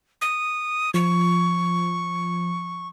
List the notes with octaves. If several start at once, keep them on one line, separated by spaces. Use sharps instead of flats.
D#6
F3 C#6